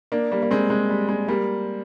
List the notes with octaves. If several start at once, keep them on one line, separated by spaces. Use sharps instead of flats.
A#3 D4
G3 A#3
A#3
G#3 C4
G#3
G3
G#3
G3 A#3